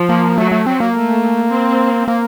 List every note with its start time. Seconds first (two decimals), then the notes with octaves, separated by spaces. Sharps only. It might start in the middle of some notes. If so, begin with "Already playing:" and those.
Already playing: F3
0.09 A#3
0.38 F#3 A3
0.52 A3
0.66 F#3 C4
0.80 A#3
0.94 A3
1.51 C4
2.08 A#3